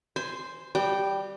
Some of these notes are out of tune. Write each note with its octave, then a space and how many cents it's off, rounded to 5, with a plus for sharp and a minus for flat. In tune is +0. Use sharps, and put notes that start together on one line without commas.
C5 +0 G#5 +0 C6 -40
G3 +0 D5 +40 G5 -5